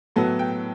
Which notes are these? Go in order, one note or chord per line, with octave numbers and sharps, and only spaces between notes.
A2 F#3 B3 A4
G5